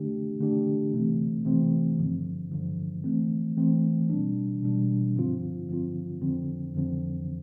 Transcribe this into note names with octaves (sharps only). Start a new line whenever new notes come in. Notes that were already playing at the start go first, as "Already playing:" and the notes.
Already playing: D3 A3 D4 G4
D3 A3 D4 G4
C3 E3 A3 C4
C3 E3 A3 C4
G2 D3 F3
G2 D3 F3
E3 A3 C4
E3 A3 C4
B2 G3 D4
B2 G3 D4
G2 D3 F3 C4 F4
G2 D3 F3 C4 F4
F2 D3 F3 C4
F2 D3 F3 C4